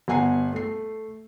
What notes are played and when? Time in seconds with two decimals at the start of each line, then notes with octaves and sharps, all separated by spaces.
0.08 G1 B3 F#5 G#5 A#5 C7
0.53 A3 C7